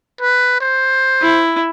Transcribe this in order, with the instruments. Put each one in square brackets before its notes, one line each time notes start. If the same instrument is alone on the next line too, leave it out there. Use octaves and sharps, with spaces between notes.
[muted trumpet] B4
C5
[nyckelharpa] E4